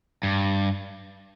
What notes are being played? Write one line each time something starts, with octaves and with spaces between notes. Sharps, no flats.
G2